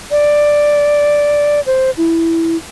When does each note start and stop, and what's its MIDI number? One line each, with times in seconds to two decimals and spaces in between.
0.11 1.60 74
1.66 1.90 72
1.98 2.56 64